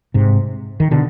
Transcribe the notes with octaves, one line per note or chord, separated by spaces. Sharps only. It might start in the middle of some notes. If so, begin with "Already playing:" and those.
G#2 C3
D#3
B2 D3